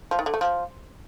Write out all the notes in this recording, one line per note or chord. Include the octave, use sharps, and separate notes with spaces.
F3
D#3
D3
A3
F3